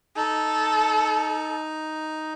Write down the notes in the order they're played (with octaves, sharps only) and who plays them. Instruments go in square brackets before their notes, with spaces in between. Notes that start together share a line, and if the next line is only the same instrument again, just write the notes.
[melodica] D#4 [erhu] A4